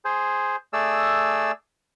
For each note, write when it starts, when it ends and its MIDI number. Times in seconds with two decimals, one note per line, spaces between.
0.05 0.56 68
0.05 0.56 72
0.73 1.52 57
0.73 1.52 68
0.73 1.52 74
0.73 1.52 88